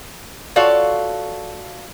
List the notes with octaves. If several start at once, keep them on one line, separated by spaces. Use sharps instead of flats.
F4 F#4 A4 C#5 D5 F5